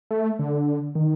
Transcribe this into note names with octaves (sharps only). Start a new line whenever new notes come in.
A3
D3
D#3